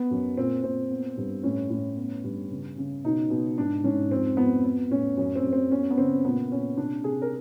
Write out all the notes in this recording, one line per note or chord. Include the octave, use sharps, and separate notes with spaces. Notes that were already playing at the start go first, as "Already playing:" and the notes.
Already playing: B3
F#2
A#2 C4
A#2 C4
B3
G2
A2 C#4
A2
B3
G2
C#3
C#3
B2 D#4
B2
G#2 D4
G#2 C#4
F2 C4
F2 B3
B3
A2 C#4
F#2 C#4
C4
F#2
C4
B3 C#4
B3
C#3 C4
A#2 B3
A#2 C#4
C3 D4
C3 G#4
A#4